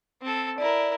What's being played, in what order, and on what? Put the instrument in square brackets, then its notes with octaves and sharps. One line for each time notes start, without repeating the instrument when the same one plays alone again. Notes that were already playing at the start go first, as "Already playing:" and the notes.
[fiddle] C4 A4
[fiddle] E4 A#4 [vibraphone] D5